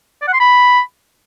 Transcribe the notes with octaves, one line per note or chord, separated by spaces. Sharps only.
D5
F#5
C6
B5